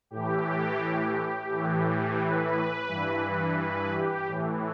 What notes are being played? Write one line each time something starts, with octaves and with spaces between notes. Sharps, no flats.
A2 E3 G4
A2 E3
B4
G2 E3
B4
G4
A2 E3